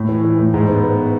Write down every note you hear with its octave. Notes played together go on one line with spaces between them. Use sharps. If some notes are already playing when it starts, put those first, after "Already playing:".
Already playing: A2
E3
E3
A2
G#2
B3
B3